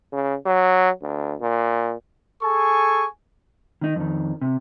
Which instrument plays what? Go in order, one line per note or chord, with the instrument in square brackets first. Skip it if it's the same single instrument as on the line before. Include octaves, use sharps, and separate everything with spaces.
[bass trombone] C#3
F#3
D2
A#2
[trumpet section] G#4 A4 G#5 C#6
[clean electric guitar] D#3 D#4
F2 D#3
C3